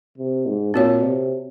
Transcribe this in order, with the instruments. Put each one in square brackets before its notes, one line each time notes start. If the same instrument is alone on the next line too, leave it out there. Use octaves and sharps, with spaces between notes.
[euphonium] C3
G#2
[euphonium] A#2 [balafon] C4 F#4 C#5
[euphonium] C3